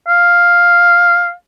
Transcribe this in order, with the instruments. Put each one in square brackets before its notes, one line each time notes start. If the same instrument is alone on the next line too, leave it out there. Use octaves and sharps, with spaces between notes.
[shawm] F5